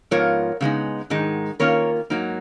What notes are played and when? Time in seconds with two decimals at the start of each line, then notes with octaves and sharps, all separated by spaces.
0.11 G#2 F3 B3 F4 A#4 C#5
0.61 C#3 G#3 B3 D#4
1.10 G#2 D#3 G#3 D#4
1.60 D#3 A#3 C#4 F4 A#4 C#5
2.10 G#2 F#3 A#3 D#4